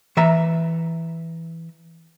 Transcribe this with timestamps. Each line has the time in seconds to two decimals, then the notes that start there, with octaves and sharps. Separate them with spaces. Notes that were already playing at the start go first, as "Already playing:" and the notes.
0.17 E3 E5 A#5